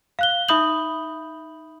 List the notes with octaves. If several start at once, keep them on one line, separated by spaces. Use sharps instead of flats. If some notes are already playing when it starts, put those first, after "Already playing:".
F5 F#6 G7
D#4 E5 B5 D#6 G6 F#7